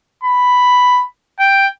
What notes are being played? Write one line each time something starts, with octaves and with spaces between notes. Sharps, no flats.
B5
G5